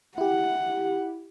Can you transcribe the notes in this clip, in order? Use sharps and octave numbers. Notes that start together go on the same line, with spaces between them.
E4 G4 F#5